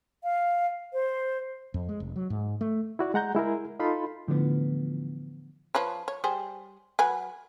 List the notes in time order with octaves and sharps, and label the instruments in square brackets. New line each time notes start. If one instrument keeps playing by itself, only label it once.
[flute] F5
C5
[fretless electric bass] F2
G#3
F1
F#3
G#2
A3
[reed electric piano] E4 F#4 D5
G#3 F#5 A#5 G6
G#3 E4 G#4 A#4
D#4 F4 A4 B5 C6
[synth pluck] A2 D3 E3 F3 B3
[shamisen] F3 B4 C#5
C#5
G3 G#4 C5
F#3 B4 G#5